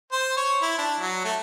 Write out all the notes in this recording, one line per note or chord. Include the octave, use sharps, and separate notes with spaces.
C5
C#5
E4
D4
F#3
A3